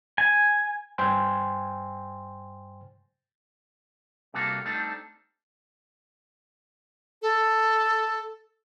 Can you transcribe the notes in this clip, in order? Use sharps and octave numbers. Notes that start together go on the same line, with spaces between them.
G#5
G2 C5 G5 G#5 C6
C3 G3 A#3 F#4 A4 F5
G3 A3 C4 D4 D#4 A4
A4